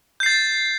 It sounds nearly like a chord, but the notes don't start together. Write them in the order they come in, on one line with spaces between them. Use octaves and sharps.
G6 C7 A6